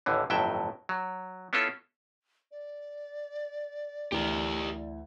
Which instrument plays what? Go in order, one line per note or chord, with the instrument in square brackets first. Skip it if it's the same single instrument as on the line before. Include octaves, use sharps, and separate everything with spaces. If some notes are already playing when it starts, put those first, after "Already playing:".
[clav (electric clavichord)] A1 D#2 D3 E3
G1 F2 A2 F#3 E5 G5
F#3
B3 C#4 E4 F4 A4
[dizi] D5
[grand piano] D2 E3 [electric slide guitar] G4 A#4